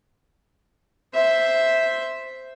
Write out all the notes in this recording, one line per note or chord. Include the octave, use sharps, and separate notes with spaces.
C5 E5